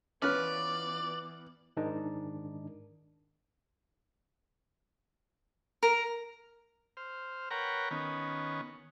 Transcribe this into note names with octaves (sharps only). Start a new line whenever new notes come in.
E3 B3 C#4 F4 B4 D5 F6 F#6
G#2 D#3 G#3 D4 D#4
A#4 A#5
C5 F6
A#4 B4 C#5 F#5 G5 A#5
D#3 B3 C#4